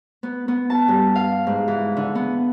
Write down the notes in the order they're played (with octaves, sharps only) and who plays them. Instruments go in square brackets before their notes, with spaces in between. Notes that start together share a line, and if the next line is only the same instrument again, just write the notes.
[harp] B3
B3
A5
G2
F5
G#2
E3
D3
B3